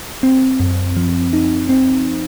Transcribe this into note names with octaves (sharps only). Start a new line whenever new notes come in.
C4
F#2
F3
D#4
C4